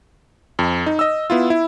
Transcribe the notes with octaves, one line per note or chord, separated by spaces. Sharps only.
F2
D#4
D#5 E6
B3 E4 F4
E4